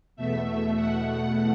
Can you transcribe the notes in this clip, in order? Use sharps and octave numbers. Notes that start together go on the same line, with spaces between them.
E2 B2 A3 E5
F#5